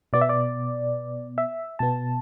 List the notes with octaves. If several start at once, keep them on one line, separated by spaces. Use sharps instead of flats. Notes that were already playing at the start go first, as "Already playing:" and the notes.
B2 B3 D5
E5
D5
E5
B2 B3 A5